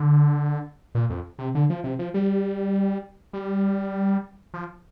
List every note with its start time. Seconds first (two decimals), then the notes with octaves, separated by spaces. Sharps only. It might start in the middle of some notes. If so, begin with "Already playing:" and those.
Already playing: D3
0.95 A#2
1.10 F2
1.39 C3
1.55 D3
1.70 F3
1.84 C3
1.99 F3
2.14 G3
3.33 G3
4.54 F3